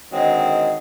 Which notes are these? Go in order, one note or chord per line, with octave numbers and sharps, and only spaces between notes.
D3 D#3 F#3 G#3 C4